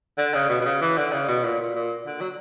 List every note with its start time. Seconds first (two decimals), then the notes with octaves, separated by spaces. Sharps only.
0.18 D3
0.34 C#3
0.49 B2
0.61 B2
0.66 C#3
0.81 E3
0.97 D3
1.12 C#3
1.28 B2
1.44 A#2
1.60 A#2
1.75 A#2
2.07 D3
2.20 F#3